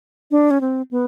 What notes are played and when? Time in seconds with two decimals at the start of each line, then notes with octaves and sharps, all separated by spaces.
0.31 D4
0.51 C#4
0.61 C4
0.91 B3